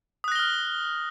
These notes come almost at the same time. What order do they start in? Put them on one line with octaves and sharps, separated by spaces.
D#6 F#6 A#6 G7 F6